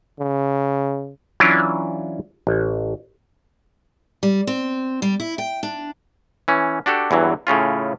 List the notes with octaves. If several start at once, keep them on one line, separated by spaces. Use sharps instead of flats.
C#3
E3 F#3 C#4 D4 E4 F4
A1
G3
C4
G3
E4
G5
D4
E3 C#4
D4 F#4 G4 A4
E2 G2 E3 F#3
A2 C#3 C#4 F4